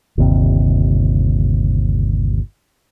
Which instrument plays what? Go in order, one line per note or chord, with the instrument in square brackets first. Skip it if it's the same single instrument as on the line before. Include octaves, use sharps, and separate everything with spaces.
[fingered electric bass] G1 D#2 C3